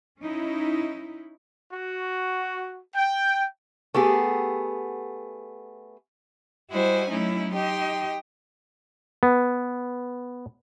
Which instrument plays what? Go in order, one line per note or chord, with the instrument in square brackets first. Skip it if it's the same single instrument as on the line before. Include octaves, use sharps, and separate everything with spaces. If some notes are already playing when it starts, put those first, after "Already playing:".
[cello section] C#4 D#4 E4
[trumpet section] F#4
G5
[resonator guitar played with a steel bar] A3 B3 G4 G#4
[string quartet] G3 E4 F#4 C5 D#5 G#5
F#3 A3 C#4 D#4 E4
D#4 G4 D#5 G5 C6
[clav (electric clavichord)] B3